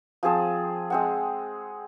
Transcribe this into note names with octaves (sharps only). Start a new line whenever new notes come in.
F3 C4 G#4 A5
G#3 C4 F#5